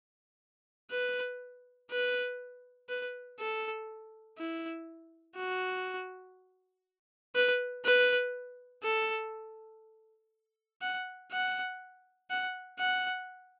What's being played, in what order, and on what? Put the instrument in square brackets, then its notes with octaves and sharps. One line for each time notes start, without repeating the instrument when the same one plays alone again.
[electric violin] B4
B4
B4
A4
E4
F#4
B4
B4
A4
F#5
F#5
F#5
F#5